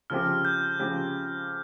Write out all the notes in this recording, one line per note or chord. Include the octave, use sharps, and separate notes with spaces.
C#3 F3 C4 G4 F6
G6
C#3 F3 C4 G4